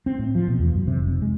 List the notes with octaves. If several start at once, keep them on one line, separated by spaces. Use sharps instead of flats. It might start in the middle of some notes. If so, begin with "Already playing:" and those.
C4
A2
F3
B2
E2
F#2
C3
F1
G#3